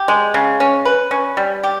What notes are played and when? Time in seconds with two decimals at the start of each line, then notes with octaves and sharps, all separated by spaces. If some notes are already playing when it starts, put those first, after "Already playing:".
Already playing: G4
0.08 G#3
0.34 C#3
0.60 C#4
0.85 B4
1.11 C#4
1.37 G3
1.63 G4